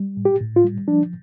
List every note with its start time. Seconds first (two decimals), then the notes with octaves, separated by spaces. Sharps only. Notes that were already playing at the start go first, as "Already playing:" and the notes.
Already playing: G3
0.17 A2
0.25 G4
0.40 A2
0.56 F4
0.64 G3
0.87 F3 D4